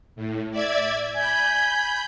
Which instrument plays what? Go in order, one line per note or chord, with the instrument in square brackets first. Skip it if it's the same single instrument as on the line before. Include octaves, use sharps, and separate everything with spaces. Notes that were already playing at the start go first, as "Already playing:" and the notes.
[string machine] A2
D5 E5 G#6
[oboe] G#5 [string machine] B5 G6